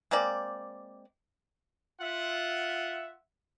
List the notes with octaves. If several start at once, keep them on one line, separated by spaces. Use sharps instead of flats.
G#3 A#3 C4 D5
F4 E5 F#5